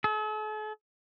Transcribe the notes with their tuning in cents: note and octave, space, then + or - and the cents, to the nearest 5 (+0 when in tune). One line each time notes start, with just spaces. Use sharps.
A4 -45